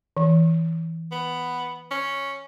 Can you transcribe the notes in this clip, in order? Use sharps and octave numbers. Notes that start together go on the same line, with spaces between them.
E3
B3
C#4